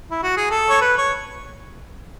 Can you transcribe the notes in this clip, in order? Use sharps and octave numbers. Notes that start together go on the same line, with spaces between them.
E4
F#4
G#4
A4
C#5
B4
C#5